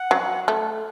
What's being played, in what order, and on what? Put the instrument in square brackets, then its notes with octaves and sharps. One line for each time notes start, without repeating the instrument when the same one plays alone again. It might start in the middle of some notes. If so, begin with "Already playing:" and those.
Already playing: [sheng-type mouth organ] F#5
[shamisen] F#3
A3